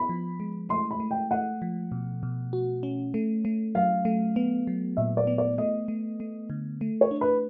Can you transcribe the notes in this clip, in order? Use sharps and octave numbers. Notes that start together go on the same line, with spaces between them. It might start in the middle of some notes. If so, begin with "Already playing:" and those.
Already playing: B3 B5
F3
G#3
A3 C6
B5
A3
G5
A3 F#5
F3
B2
B2
F#4
C#4
A3
A3
F#3 F5
A3
B3
F#3
A#2 E5
D5
B3
D5
A3 D#5
A3
A3
D3
A3
C#5
D4
B4